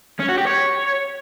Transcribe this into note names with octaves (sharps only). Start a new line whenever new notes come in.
C#4
F#4
G4
C#5